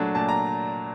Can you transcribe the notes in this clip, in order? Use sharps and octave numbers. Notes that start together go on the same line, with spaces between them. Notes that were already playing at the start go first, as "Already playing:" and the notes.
Already playing: A#2 F#3 A3 D4 A5
A#2 A5
A#5